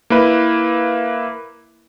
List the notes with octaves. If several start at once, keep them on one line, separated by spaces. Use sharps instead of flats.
A#3 E4 B4